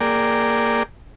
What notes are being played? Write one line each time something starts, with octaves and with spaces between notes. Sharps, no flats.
A#3 G#4 A#4 D5 G5